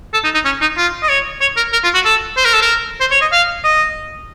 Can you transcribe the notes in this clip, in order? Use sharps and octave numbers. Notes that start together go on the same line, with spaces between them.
A4
D#4
D#4
C#4
D#4
F4
D#5
C#5
C#5
A#4
A#4
F4
F#4
A4
C5
A#4
A4
A#4
C5
C#5
D#5
F5
D#5